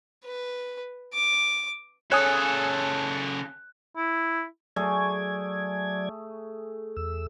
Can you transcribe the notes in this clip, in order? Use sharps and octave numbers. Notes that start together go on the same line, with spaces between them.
B4
D6
C#3 A4 C#5 G#5 D#6 F#6
E4
F#3 A3 G#4 D5 G#6
E2 E6